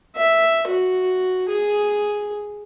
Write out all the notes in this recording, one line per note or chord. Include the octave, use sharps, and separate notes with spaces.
E5
F#4
G#4